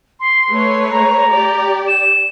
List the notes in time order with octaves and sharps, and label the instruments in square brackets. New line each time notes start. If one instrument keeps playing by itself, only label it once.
[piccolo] C6
[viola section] A3 B4 C#5
[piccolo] A#5
[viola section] G4 D5
[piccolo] E7